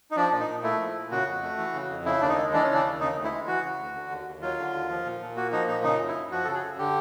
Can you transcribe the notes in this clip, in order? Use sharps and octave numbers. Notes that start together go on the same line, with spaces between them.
D#4
F3 D4
A#2
D#4
A#2
A3 E4
F3
A#2
C#3 F#4
F2
A3
E3
C#3
F2
C#3 E4
D#2 D4
D#4
G#3
E3 D4
C#3 C#4
D4
D#2
C#3 D#4
D2
E4
G#3
E3 F#4
C#3
D2
D3
D#2
D#2
F#3 F4
D3
D#2
F3
A#2
A#2
A#3 F#4
F3 D#4
A#2 D#4
C#3 D#4
F#2
E4
F#2
F3 F#4
C#3 A4
G#4
F#2
D3 G4